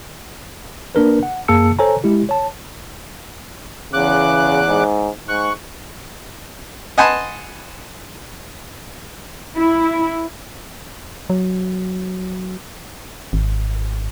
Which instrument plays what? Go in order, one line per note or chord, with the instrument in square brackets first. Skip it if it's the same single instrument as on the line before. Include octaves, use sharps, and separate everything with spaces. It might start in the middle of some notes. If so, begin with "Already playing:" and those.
[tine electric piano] A#3 D4 A#4 B4
F#5
F#2 A#3 G#4 A5 E6 C#7
A4 C5 C#5 G#5 A#5
G#3 E4 G4
C#5 A5
[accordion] E2 D6 F#6 [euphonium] C#3
[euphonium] G#2
[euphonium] G#2 [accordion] C#6 F#6
[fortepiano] D#5 F#5 G#5 A5 B5 C6
[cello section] E4
[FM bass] F#3
G#1